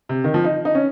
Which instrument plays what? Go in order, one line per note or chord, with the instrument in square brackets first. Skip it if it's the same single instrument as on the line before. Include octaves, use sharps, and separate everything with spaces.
[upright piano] C3
D#3
F3
D#4
D#4
C#4